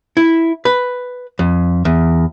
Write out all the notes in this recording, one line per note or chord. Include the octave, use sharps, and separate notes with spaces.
E4
B4
F2
E2